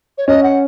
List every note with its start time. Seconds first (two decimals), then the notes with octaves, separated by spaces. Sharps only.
0.18 C#5
0.27 C#4 D#5
0.43 F#5